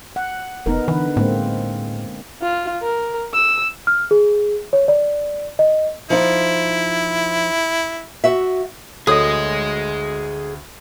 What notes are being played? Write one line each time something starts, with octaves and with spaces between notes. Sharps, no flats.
F#5
F1 B3 D#4 A#4
D3 E3 B4
A2 G#3 A#3 C4
F4
A#4
E6
F6
G#4
C#5
D5
D#5
F3 D#4 E4
F#4 E5
D2 F#4 G#4 A4 C#5 D#5 D#6